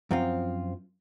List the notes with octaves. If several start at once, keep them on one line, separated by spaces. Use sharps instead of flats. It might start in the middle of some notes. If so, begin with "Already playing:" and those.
F#2 F3 C4 F4